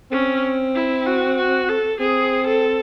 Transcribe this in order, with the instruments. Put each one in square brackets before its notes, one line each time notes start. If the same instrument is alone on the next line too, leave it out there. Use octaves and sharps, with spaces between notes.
[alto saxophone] C4 [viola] C#4
[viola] E4
F#4
F#4
A4
[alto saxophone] C4 [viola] G#4
[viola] A4